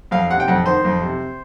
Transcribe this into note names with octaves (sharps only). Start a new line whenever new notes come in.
F2 F5
C3 F#5
G5
F2 F#5
D#3 C5
F2
C3